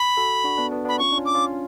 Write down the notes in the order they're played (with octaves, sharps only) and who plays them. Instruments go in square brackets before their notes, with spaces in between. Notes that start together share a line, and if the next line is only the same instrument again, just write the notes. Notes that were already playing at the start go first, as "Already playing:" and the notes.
Already playing: [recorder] B5
[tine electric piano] F#4 A4
D4 F#4
B3 D4
B3 D4
[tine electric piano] B3 D4 [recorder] B5
[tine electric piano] C#4 F4 [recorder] C#6
[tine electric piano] D4
C#4 F4
[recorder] D6
[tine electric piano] C#4 F4